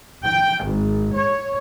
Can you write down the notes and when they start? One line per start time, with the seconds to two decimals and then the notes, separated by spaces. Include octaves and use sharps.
0.24 G5
0.64 G#1
1.13 C#5